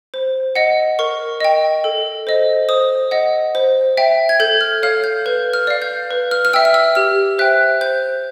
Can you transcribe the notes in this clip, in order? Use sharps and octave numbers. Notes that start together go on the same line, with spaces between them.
C5
D#5 F#5
A#4 C#6
D#5 G5
A4
C5 D#5
C5 D#6
D#5 F#5
C5
E5 G5
G#6
A4 G6
F6
C#5 F5 F6
G6
B4 G6
F6
D5 F5
G6
B4
F6
F6
E5 G5 E6
F6
E6
G4 F6
C5 E5 G5 F#6
C5 G6